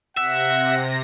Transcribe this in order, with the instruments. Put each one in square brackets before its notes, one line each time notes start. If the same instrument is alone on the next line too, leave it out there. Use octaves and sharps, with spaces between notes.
[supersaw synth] C3 A#6 [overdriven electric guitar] E5 [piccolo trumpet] F#5